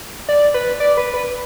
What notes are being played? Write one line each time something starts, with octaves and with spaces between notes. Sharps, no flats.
D5
B4
D5
B4
B4